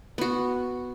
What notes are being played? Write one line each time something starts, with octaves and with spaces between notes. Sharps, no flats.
B3 F#4